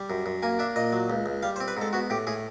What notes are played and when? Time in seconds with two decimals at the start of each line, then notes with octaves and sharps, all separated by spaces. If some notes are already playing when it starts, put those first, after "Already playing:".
Already playing: G3
0.10 F#2
0.26 F#2
0.42 A#3 G#5
0.59 D4 E5
0.76 A#2 D#5
0.92 F#3
1.10 C#2
1.26 C#2
1.43 G3 F5
1.56 C5
1.60 C4
1.68 B4
1.77 G#2 A4
1.93 B3 F#4
2.10 A2 G4
2.27 A2 G#4